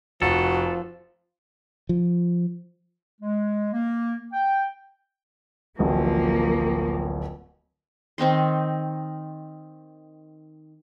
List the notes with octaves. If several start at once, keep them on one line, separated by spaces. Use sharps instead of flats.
F1 F3 F#4 A4
F3
G#3
A#3
G5
D1 A1 F3 A#3
D#3 C4 D#4 C6